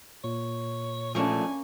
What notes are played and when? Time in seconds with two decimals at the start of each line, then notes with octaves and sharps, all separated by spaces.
0.24 A#2 C#5
1.15 F3 A3 A#3 C#4 D4 G#5